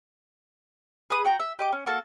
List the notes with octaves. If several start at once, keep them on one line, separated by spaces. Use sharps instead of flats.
G#4 B4 D#6
F#4 G5 A#5
E5
G4 D#5 D6
C#4
A#3 F#4 A4 A5